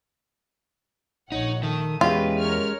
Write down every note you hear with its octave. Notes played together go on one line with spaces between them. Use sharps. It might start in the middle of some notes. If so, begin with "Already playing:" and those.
A#1 D#4 C#5 F#5
D#3 A3 D#6
E2 G#3 C#4 F4 G4 B4
A#4 C#5 F6